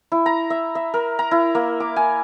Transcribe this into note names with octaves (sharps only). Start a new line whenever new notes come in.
E4
A#5
E5
E5
A#4
A#5
E4
A#3
D6
G#5